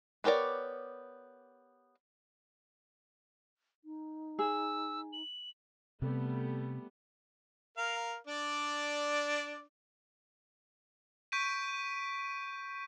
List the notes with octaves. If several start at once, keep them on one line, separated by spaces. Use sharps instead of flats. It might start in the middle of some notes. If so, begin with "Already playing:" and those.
B3 G4 A#4 C#5 D5
D#4
G#4 E6
F#7
C3 G3 A3 B3
A#4 F5
D4 D5
C#6 G6 B6 D7 D#7